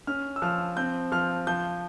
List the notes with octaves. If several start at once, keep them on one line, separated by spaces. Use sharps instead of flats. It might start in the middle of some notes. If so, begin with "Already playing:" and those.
C#4 F6
E6
F3 F6
C4 G6
F3 F6
F3 G6